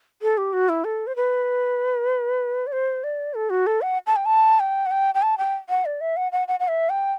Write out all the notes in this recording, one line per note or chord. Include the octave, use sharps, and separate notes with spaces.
A4
G4
F#4
E4
A4
C5
B4
D5
C5
D5
A4
F#4
A4
F#5
A5
G5
A5
G5
F#5
G5
G5
A5
G5
F#5
D5
E5
F#5
F#5
F#5
F#5
E5
G5